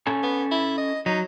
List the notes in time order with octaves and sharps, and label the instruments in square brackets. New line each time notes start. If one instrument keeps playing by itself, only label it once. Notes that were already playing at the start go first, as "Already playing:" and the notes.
[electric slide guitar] C#4 A4 G#5
[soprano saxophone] B3
E4
D#5
[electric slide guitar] F#3 [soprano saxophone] D#4